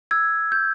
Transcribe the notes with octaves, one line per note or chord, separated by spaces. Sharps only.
E6 G#6
G6